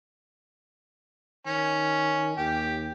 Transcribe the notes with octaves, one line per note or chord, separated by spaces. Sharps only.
D#3 C#4
D#2 G4